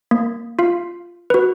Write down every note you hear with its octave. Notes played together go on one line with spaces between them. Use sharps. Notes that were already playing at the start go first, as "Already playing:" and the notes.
A#3
F4 F5
F#4 B4